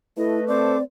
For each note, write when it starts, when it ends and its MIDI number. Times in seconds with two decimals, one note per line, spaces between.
0.17 0.78 57
0.17 0.40 64
0.17 0.44 69
0.17 0.78 71
0.17 0.44 75
0.48 0.83 60
0.48 0.77 69
0.48 0.77 72
0.48 0.83 74
0.48 0.77 86